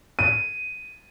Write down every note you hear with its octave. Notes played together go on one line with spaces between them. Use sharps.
D#7